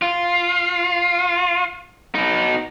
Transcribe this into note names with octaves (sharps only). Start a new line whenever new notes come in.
F4
B2 D#4